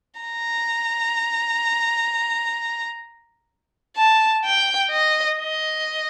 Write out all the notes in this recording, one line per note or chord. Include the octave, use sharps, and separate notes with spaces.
A#5
A5
G5
D#5
D#5